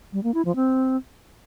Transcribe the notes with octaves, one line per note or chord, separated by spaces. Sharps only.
G3
A#3
E4
F3
C4